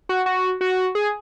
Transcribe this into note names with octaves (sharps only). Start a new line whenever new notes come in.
F#4
F#4
F#4
G#4